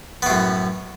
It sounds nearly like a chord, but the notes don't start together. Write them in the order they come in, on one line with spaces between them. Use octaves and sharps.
B3 A2 F#2